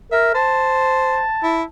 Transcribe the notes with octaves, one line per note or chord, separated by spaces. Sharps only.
A#4 E5
C5 A5
E4